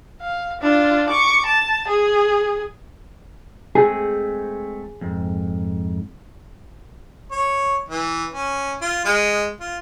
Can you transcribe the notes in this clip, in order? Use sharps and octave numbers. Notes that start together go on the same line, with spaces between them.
F5
D4 F4
C#6 D6
A5
G#4
G#3 A3 C4 G#4
F2 G#2
C#5
E3
C#4
F4
G#3
F4